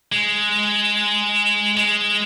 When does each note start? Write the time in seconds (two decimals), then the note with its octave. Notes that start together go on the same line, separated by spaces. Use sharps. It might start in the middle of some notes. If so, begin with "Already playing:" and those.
0.12 G#3
1.77 G#3